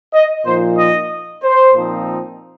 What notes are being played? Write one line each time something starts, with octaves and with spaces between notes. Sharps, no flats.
D#5
A#2 F3 D#4 C5
D#5
C5
A#2 F3 C4 D#4